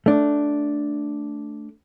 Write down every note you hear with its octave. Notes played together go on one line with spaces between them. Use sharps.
A3 D4